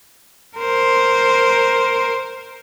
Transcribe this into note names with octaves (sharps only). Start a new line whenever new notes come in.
A#4 C5